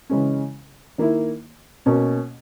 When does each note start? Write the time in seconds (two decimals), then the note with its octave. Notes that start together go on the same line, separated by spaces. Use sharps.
0.10 C#3 E3 G#3 C#4
0.98 D#3 A#3 E4
1.86 B2 A#3 C#4